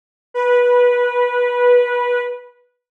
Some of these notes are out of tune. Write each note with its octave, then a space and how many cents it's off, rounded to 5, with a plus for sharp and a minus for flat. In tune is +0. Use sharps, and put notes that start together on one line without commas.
B4 -15